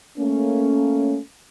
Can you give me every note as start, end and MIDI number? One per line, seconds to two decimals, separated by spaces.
0.18 1.19 57
0.18 1.19 58
0.18 1.19 61